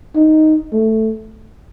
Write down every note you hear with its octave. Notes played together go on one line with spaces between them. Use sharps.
D#4
A3